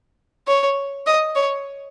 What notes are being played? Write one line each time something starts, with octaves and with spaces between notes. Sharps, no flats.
C#5
D#5
C#5